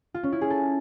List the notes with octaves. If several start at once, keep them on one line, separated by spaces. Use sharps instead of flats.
F4
C#4
E4
G#4
A4